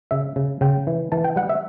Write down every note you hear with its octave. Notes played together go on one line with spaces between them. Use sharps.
C#3 E5
C#3
C#3 G5
E3
E3 A5
G5
G3 F#5
E5